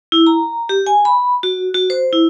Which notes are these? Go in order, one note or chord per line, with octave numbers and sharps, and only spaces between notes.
E4
A#5
G4
G#5
B5
F#4
F#4
C5
E4